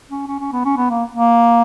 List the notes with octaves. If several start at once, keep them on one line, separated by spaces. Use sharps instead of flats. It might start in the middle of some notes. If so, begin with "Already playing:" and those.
C#4
C#4
C#4
B3
C#4
B3
A#3
A#3